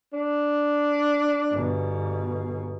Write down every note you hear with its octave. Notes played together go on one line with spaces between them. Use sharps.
D4
G1 B2